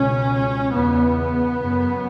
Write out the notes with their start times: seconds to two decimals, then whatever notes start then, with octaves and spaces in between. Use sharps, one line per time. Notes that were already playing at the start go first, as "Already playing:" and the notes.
Already playing: C#2 B2 C#4
0.72 E2 C#3 B3
1.56 F#2 C#3